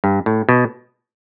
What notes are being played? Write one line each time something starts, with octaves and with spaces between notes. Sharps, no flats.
G2
A2
B2